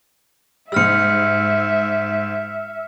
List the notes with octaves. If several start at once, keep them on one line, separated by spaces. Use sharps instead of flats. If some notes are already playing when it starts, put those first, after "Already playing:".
G#2 G3 E5 E6 F6 C#7